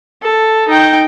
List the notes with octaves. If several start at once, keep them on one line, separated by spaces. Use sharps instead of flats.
A4
D#4 G5